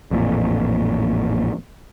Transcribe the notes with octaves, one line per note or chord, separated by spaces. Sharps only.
A1 F2 A#2